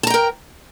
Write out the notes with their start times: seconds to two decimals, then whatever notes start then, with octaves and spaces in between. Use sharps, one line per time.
0.03 A5
0.07 A#5
0.10 G5
0.14 A#4